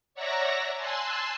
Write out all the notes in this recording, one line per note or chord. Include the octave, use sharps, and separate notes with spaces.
C#5 D5 E5 F#5 A#5 A#6
G#5 A5 C6 E6 F#6